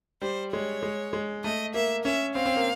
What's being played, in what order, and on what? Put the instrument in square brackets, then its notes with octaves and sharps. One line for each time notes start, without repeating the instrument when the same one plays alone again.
[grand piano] G3 [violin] C5
[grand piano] G#3 [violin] C#5
[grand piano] G#3
G#3
[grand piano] A3 [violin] D#5
[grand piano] A#3 [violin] E5
[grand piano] C#4 [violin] E5
[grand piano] C4 [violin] F5
[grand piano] C4
A#3